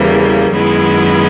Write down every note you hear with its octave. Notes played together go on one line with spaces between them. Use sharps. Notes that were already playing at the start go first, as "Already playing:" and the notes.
Already playing: E2 C#3 E3 G3 A#3
F#2 D#3 G#3 B3 E4